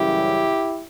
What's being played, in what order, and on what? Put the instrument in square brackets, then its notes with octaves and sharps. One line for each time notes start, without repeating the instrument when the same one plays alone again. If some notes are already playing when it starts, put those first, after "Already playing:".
Already playing: [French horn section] F#2 C#3 E3 G3 E4 G4